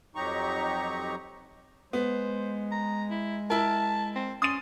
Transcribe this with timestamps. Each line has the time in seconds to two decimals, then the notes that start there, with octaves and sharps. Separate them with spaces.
0.15 F2 F#3 D#4 G4 A#5 C#6
1.93 G#3 B3 C5
2.71 A#5
3.10 E4
3.50 E4 A#4 A5
4.15 C4
4.42 C#4 C6 D#6 A6 D#7